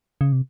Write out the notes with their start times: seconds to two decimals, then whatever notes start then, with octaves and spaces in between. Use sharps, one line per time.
0.21 C#3
0.33 C3